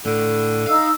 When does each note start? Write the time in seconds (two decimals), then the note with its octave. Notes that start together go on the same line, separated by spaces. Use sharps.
0.06 A2 D3
0.67 D#4 F5 E6